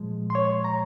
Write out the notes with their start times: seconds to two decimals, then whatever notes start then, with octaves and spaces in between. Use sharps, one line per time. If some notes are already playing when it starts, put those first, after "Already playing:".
Already playing: A#2 F3 G#3
0.30 C6
0.35 C#5 C#6
0.64 A#5